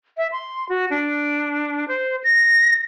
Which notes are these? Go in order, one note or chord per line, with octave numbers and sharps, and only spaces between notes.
E5
C6
F#4
D4
C5
A#6